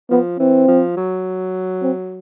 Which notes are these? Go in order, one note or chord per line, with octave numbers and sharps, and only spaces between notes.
F3 B3
E3 C4
F3
F#3
C4